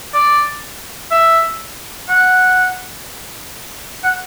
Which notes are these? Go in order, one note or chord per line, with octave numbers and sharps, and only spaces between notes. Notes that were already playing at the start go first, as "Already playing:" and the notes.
D5
E5
F#5
F#5